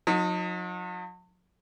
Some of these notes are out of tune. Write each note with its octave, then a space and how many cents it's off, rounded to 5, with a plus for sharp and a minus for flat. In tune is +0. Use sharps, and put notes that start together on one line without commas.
F#3 -45 D#4 +5